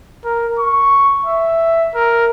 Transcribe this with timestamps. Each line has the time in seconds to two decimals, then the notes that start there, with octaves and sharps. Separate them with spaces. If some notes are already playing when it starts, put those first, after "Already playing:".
0.24 A#4
0.59 C#6
1.26 E5
1.95 A#4